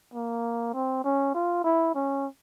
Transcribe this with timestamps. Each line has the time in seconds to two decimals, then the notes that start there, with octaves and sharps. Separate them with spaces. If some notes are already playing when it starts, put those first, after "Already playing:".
0.14 A#3
0.74 C4
1.04 C#4
1.35 F4
1.65 E4
1.95 C#4